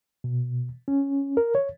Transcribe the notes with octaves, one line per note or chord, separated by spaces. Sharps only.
B2
C#4
A#4
C#5